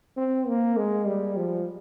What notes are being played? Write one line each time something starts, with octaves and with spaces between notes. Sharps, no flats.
C4
A#3
G#3
G3
F3